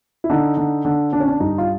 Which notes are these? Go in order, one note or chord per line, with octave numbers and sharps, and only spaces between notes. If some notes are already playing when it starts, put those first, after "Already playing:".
E4
D3 D#4
D3
D3
D3 D4
C#4
D4
G2 D#4
F4